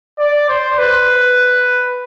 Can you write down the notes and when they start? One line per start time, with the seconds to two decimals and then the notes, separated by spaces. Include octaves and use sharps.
0.19 D5
0.49 C5
0.78 B4